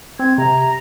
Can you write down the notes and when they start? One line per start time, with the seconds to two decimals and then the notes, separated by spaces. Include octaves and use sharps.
0.19 C4 G#6
0.38 C3 A#5